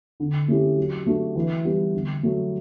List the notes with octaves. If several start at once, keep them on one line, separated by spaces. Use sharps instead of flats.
D3
A3 C#4 E4 G4
F#3
A3 D4 F#4
E3
G3 B3 E4
D3
F#3 A3